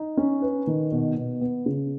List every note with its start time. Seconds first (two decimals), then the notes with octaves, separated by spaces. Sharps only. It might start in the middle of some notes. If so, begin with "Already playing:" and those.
Already playing: D#4
0.17 C#4
0.42 B4
0.67 D#3
0.92 B2
1.17 B2
1.41 B3
1.66 C#3